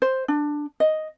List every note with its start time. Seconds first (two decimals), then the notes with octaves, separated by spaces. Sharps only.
0.02 C5
0.28 D4
0.80 D#5